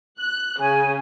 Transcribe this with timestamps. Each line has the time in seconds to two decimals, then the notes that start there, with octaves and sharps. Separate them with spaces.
0.19 F#6
0.60 C#3 G#5